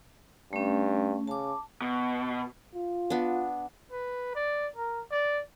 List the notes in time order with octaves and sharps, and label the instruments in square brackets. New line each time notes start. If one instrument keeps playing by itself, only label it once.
[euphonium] G2 [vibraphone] A3 C#4
[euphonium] C#3 [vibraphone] A5 D6
[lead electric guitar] B2
[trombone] F4
[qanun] B3 D4
[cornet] B4
D5
A#4
D5